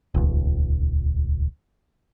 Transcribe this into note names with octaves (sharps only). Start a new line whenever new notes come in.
D#1 C#2